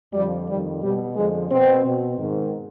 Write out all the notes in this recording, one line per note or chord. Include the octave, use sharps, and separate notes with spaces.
F2 D3 F3 G3
F2 D#3 G3
B2 G3
F2 D3 F3 G#3
B2 C4
B2
G#2 D#3